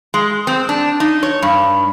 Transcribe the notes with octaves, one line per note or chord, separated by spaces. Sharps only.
G#3
C4
D4
D#4
C#5
G2